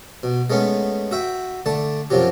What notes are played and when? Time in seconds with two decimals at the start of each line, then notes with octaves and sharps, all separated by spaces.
0.23 B2
0.50 G#3 A3 B3 C#4
1.11 F#4 E5 G5
1.66 D3 A3 A5
2.10 F#2 C3 F3 F#3 G4